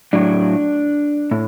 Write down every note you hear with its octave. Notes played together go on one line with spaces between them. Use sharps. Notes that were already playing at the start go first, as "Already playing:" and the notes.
A2 F#3 D4
A2